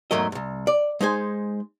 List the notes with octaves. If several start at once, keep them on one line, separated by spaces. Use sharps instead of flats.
E2 G#2 F#3 A3 A#4 D#5
C2 F#2
D5
G#3 D#4 C5 G#5